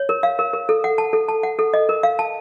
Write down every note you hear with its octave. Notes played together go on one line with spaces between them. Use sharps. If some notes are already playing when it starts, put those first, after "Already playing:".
Already playing: C#5
A#4
F5
A#4
A#4
A4
F#5
A5
A4
A5
F#5
A4
D#5
A#4
F5
A5